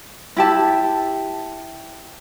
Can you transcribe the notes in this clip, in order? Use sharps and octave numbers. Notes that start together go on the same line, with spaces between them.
E4 G4 A5